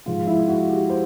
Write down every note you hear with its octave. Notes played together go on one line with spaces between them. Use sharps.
G#2 F3 G#3 F4
E4
F#4
G4
C5